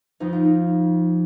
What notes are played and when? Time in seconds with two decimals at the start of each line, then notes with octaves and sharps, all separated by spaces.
0.20 F2 F3 D#4
0.33 F4
0.45 D#4